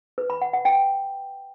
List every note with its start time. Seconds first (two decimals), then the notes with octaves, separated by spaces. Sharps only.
0.18 B4
0.30 B5
0.42 F#5
0.53 F#5
0.65 G5